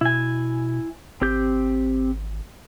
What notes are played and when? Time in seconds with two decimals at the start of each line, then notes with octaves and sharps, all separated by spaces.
0.01 B2 E4 G#5
1.22 G#1 C4 G4 G6